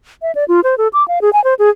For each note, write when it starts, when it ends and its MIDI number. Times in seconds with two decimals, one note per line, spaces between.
0.22 0.32 76
0.35 0.44 74
0.48 0.60 65
0.64 0.75 72
0.78 0.88 69
0.93 1.06 86
1.08 1.19 77
1.22 1.32 68
1.33 1.43 80
1.44 1.54 72
1.59 1.70 68